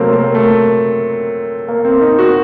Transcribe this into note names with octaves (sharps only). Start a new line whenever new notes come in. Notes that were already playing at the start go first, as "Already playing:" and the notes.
Already playing: C3 F#3 A3 A#3 C4
A#3
A3
A#3
C4
D#4
F#4